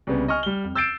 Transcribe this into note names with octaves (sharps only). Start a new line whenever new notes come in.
C2 C#3 B3
D#5 G#5 C#6 F6
G3 G7
F2
E6 G6 A6 C7 D7 E7